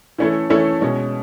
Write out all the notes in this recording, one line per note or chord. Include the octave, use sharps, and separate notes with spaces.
E3 A3 C#4 E4 A4
E3 A3 C#4 E4 A4
B2 G#3 C#4